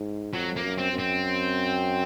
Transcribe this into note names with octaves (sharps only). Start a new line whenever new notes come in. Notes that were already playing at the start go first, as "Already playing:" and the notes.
Already playing: G#2
F2 F#3
A#3
F#2
C4
F#2
C4